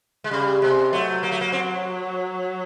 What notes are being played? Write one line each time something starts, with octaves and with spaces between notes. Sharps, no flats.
G#3
C#3 G3
C3 G#3
F#3 A3
A#3
A3
A#3
C4